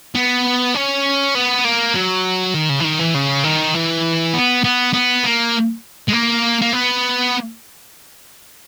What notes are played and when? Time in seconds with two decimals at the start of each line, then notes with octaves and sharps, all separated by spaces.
0.15 B3
0.75 C#4
1.35 B3
1.65 A#3
1.95 F#3
2.54 D#3
2.69 C#3
2.80 E3
2.84 D#3
2.99 E3
3.14 C#3
3.44 D#3
3.74 E3
4.34 B3
4.64 B3
4.93 B3
5.23 A#3
6.09 G#3
6.13 A#3
6.62 A#3
6.73 B3